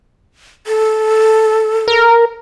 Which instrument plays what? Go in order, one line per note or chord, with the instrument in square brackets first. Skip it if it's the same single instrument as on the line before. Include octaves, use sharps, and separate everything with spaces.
[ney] A4
[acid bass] A#4